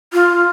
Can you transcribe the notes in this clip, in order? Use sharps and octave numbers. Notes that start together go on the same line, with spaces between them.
F4